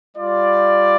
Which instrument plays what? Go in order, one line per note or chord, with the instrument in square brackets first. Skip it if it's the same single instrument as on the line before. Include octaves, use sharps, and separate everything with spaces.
[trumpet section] G3 F4 D5